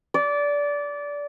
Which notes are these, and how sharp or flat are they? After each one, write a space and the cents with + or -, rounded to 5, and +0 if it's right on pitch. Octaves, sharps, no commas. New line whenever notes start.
D5 -20